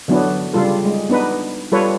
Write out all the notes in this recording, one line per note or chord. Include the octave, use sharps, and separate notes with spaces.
D3 F#3 B3 D4 E4
C#3 G3 F4 A4
G#3
B3 D4 D#4 B4
G3 F4 A4 B4 C#5